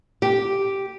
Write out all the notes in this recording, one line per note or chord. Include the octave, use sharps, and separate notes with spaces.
G4